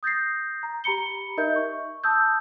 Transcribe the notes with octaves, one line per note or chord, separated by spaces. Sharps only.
D#6 G6 A6 A#6 C7
A#5
G4 A#5 B5 C#7 G7
D#4 A#4 D#5 E5 G6
C#6
A5 D#6 E6 G6